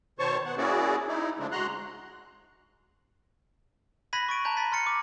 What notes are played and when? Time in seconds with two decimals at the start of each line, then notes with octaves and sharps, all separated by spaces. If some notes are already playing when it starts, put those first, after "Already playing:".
0.19 B2 D#3 C5 C#5 A5 C#6
0.46 B3 F#5
0.57 A#3 C#4 E4 F#4 G#4 D5
1.08 D#4 E4
1.39 C#3 F3 G#3 A3 D4
1.52 G#3 F#4 A#5 C6 F#6
4.13 B5 F#6 G#6 A#6 B6 D#7
4.29 C#6 A6 D7 D#7
4.45 A5 A#5 G6
4.57 B5 A6 B6 D#7
4.72 C6 F6 A6 C#7
4.87 D6